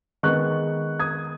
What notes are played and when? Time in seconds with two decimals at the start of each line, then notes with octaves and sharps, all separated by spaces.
0.23 D#3 G#3 B3 C#6 F#6
1.00 D#6 G#6